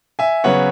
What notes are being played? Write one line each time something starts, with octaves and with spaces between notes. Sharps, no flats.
E5 G#5
C#3 F#3 B3 C#5 F#5